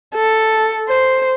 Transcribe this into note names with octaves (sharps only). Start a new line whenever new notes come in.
A4
C5